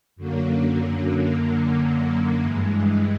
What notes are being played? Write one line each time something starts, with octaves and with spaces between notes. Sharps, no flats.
F#2 D3 F#3 A#3
G2 E3 G#3